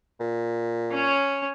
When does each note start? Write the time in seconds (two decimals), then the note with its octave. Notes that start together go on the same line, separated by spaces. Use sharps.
0.20 A#2
0.91 C#4 C#5